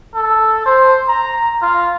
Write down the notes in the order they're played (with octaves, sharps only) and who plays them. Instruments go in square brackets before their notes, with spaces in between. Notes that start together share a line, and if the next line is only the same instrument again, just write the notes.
[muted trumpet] A4
C5
A#5
F4